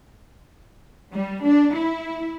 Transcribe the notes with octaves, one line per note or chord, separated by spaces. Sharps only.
G3
D4
E4